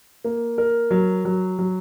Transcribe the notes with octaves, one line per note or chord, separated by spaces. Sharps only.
A#3
A#4
F#3
F#3
F#3